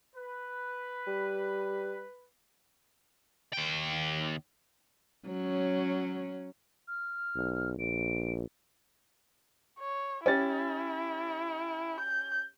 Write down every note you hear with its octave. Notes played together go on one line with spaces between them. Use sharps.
B4
G3
D#2 G5
F#3 C#4
F6
B1
A#1 D7
C#5
C#4 E4 G4 A6
G6